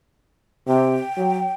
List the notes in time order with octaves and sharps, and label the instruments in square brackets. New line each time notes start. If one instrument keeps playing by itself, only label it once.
[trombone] C3 [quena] G5
[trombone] F#3